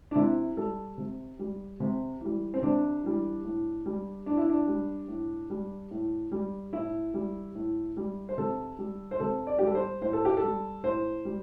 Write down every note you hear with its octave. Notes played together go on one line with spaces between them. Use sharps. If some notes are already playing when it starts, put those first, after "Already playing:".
D4
C3 E4
G3 A4
C3
G3
C3
E3 G3
C4
C3 D4
E3 G3
A2
G3
A2 D4
E4
D4
G3
A2
G3
A2
G3
A2 E4
G3
A2
G3
C5
C3 A4
G3
C5
C3 A4
D5
G3 G4
A4
C5
A2 C5
A4
G4
A4
G3
A2 C5
G3